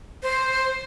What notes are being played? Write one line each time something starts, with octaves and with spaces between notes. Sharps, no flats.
C5